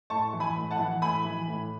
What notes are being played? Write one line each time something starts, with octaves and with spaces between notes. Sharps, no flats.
A2 A5 C#6
E3
G#5 B5
A2
F#5 A5
E3
A2 G#5 B5
E3
A2